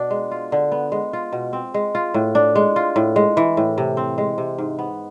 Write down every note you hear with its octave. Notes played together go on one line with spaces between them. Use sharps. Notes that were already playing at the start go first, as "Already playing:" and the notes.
Already playing: B2 D4
G#3
F4
D3
B3
G#3
F4
B2
C4
G#3
F4
A2
D4
G#3
F4
A2
G#3
E3
A2
C3
C4
G#3
C3
G#2
B3